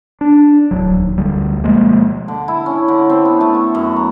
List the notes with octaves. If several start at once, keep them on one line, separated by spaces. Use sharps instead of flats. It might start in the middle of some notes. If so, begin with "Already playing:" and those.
D4
D1 G1 F#3
D#2
D2 G3
B2 F3 G#3 A#3
D3
E4
C#4
D3
C4
B3
A3
C#6
F#2
A#5